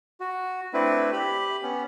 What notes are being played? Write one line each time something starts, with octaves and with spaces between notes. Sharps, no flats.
F#4
A3 C4 D4 E4 B4
G4 B5
B3 C#4